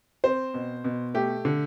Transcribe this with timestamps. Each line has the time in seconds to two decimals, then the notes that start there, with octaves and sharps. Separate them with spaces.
0.24 C4 C5
0.54 B2
0.84 B2
1.14 A3 G4
1.45 D3